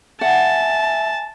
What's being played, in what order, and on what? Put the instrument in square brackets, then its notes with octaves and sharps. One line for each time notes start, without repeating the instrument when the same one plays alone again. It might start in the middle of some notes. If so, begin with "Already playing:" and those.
[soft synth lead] E5 [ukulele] F#5 [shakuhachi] G#5 [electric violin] A5